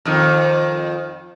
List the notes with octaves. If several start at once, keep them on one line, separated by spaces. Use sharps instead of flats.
F2 D#3